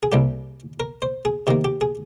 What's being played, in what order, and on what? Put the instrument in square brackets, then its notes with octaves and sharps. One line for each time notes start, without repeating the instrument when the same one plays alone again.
[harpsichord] G#4
C2 C3 G3 A#3 G4
A#4
C5
G#4
C3 D#3 A#3 G4
G4
G#4